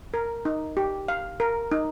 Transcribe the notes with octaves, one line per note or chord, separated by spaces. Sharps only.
A#4
D#4
G4
F5
A#4
D#4